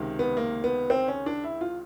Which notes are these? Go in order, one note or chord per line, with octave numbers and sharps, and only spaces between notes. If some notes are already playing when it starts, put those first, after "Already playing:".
Already playing: C#2 C3 D#3
B3
A#3
B3
C4
C#4
D4
E4
F4